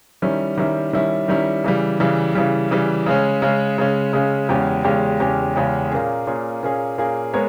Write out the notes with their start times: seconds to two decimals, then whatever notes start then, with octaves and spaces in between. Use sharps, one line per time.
0.22 D#3 G3 C#4 E4
0.58 D#3 G3 C#4 E4
0.93 D#3 G3 C#4 E4
1.28 D#3 G3 C#4 E4
1.64 C#3 E3 G3
2.00 C#3 E3 G3
2.35 C#3 E3 G3
2.71 C#3 E3 G3
3.06 C#3 G#3 C#4
3.42 C#3 G#3 C#4
3.78 C#3 G#3 C#4
4.13 C#3 G#3 C#4
4.49 E2 C#3 G#3 C#4 G4
4.84 E2 C#3 G#3 C#4 G4
5.20 E2 C#3 G#3 C#4 G4
5.56 E2 C#3 G#3 C#4 G4
5.91 A#2 A#3 C#4 G#4
6.27 A#2 A#3 C#4 G#4
6.63 A#2 A#3 C#4 G#4
6.98 A#2 A#3 C#4 G#4
7.33 G#3 B3 A#4 C#5